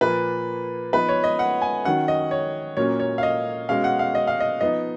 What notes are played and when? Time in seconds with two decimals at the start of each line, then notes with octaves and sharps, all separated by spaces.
0.01 A#2 F3 A#3 B4
0.93 F3 B3 D#4 B4
1.09 C#5
1.24 D#5
1.39 F#5
1.62 G#5
1.85 D#3 F#3 C#4 F#5
2.08 D#5
2.31 C#5
2.77 A#2 F#3 A#3 C#4 C#5
3.00 C#5
3.18 F5
3.23 D#5
3.69 B2 G#3 C#4 F5
3.84 F#5
3.99 F5
4.15 D#5
4.27 F5
4.40 D#5
4.61 F3 B3 D#4 D#5